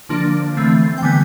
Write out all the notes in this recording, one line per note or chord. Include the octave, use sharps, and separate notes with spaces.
D3 F3 A#3 D4
E3 A3 C4
G5
D3 G3 B3 G#5